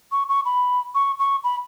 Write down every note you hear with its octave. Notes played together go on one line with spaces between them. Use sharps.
C#6
C#6
B5
C#6
C#6
B5